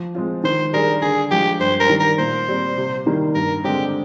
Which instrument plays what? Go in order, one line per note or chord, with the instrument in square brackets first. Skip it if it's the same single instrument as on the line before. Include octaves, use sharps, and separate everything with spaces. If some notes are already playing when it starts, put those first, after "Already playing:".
Already playing: [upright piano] F3
G#3 C4 F4
[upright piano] D#3 [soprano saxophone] C5
[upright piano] G3 D4 G#4 [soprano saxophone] A#4
[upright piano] D3 [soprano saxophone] G#4
[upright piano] F3 G#3 [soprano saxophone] G4
[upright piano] G2 [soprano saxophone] C5
[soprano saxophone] A#4
[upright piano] D#3 G3
[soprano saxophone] A#4
[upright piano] A#2 [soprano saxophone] C5
[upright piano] G3 C4
C3
D#3 G3 A#3 D#4
[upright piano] G2 [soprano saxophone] A#4
[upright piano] D3 G#3 C4 [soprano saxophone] G4